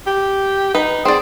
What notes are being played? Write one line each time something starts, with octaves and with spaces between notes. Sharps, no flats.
G4
D#4 B4
C4 G#4 D5